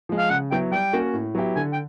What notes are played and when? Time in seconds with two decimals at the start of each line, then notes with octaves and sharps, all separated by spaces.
0.09 F3 G#3
0.18 F5
0.30 C#3 F#5
0.51 F#3 B3 E4 G5
0.72 G3 G5
0.93 A#3 C#4 F#4
1.14 A2
1.35 F#3 B3 E4 G4
1.56 D3 G#5
1.73 G5